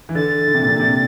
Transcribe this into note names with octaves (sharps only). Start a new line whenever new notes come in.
E3
D3 A6
D3
C3
A#2
C3
C3